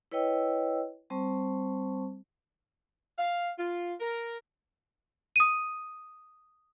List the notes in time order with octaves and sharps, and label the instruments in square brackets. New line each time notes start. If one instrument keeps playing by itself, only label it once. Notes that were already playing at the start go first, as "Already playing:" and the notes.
[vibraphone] E4 B4 C#5 D#5 G5 E6
G3 C4 C5 A5 C#6
[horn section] F5
F4
A#4
[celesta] D#6 D#7